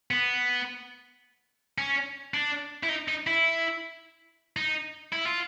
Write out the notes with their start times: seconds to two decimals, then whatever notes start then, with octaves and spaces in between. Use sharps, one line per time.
0.11 B3
1.78 C#4
2.34 D4
2.83 E4
2.89 D#4
3.08 D#4
3.27 E4
4.56 D#4
5.13 E4
5.26 F4